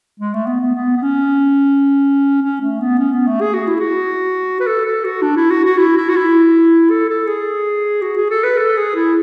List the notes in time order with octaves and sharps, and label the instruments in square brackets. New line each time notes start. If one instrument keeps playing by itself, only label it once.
[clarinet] G#3
A3
B3
B3
B3
B3
C#4
C#4
A3
B3
C#4
B3
A3
G#4
F#4
E4
F#4
B4
A4
A4
F#4
D4
E4
F#4
F#4
E4
E4
F#4
E4
A4
A4
G#4
F#4
G#4
A4
B4
A4
G#4
E4